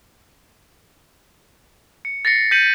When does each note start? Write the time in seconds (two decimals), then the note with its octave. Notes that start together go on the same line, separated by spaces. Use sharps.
2.05 C#7
2.25 A6 A#6 C7 C#7
2.51 G6 B6 C#7 D#7 F#7